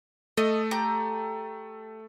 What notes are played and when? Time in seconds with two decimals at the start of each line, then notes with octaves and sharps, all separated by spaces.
0.37 A3 A4 D#5
0.71 G4 A#5 G6